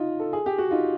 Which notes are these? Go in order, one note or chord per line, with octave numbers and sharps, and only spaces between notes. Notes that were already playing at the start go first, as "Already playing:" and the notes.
Already playing: D#4 F4
A4
G#4
G4
F#4
D#4 F4